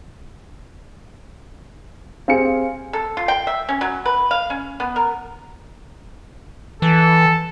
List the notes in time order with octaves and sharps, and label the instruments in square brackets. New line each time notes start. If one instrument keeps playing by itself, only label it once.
[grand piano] C4 G4 G#4 [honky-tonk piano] F5 G#5 C#7
[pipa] A4
F4
G5
E5
C#4
F#3
B4
F5
C#4
B3
A#4
[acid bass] E3 [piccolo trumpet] A4